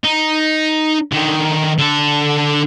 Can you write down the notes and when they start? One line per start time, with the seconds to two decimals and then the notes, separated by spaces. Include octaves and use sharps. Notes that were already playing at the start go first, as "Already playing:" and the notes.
0.04 D#4
1.12 D3 D#3
1.79 D3 A4